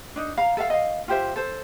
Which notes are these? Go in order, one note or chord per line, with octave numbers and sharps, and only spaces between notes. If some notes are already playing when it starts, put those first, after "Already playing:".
D4 D#4
F5 A#5
A4 E5 F5
D#5 F5
F4 G4 C5 E5
A4 C5